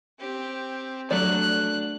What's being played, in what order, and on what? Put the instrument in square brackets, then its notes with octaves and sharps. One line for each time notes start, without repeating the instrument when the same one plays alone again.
[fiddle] C4 G4
[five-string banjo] F#3 A3 D5 [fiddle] D4 F#6